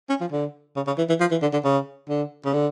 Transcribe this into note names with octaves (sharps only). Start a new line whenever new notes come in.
C#4
F3
D3
C#3
C#3
E3
E3
F3
E3
D3
D3
C#3
D3
C#3
D3